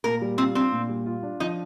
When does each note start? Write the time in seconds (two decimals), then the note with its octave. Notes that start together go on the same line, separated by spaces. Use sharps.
0.04 A#2 A#4
0.22 G3
0.38 C4 F4
0.55 C4 D4
0.72 A#2
0.89 G3
1.06 F4
1.23 D4
1.40 F3 D#4